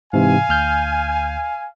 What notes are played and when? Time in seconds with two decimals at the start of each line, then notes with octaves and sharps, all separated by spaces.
0.13 G#2 C3 E3 F5 G#5
0.49 D2 F6 G6